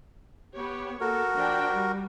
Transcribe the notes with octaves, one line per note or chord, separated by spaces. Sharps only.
B3 G4 C#5
A#3 F#4 A4 A#4
F3 D4 G5
G3